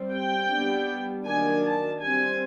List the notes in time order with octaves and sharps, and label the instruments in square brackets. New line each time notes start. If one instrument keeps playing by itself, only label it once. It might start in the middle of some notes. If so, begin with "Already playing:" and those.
Already playing: [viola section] G3 C4
G5
G3 B3 D4
D#3 F#3 A#3 D4 G#5
A5
G3 C4 G#5